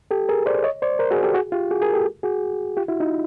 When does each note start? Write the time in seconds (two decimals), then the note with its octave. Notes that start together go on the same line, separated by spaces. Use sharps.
0.11 G4 A4
0.29 G#4 A#4
0.46 C5 D5
0.64 C#5 D#5
0.82 C5 D5
0.99 A#4 C5
1.11 F#4 G#4
1.23 G4 A4
1.34 F#4 G#4
1.52 F4 G4
1.71 F#4 G#4
1.82 G#4 A#4
1.94 G4 A4
2.23 F#4 G#4
2.77 F4 G4
2.88 E4 F#4
3.00 D#4 F4